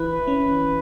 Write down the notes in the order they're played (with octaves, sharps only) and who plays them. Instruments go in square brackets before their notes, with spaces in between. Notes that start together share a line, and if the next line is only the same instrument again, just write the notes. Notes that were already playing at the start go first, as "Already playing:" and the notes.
Already playing: [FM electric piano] E3 E4 [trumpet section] B4
[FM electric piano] C#4